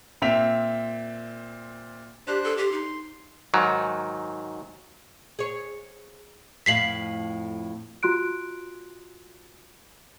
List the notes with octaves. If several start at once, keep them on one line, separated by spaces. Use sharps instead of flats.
A#2 C4 E5 B6 F7
D4 G4 C5 F#6
A4
G4 C6
D#4
G#2 D#3 F#3
G#4 C#5
F2 A2 F5 B6 C7 F#7
F4 F#4 C6 F#6 D7